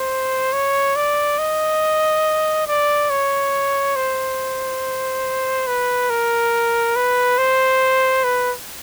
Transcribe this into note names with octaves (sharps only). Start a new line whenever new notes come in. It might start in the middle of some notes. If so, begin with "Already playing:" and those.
Already playing: C5
C#5
D5
D#5
D5
C#5
C5
B4
A#4
B4
C5
B4